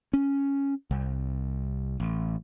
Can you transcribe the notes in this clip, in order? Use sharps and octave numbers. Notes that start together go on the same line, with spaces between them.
C#4
C2
A1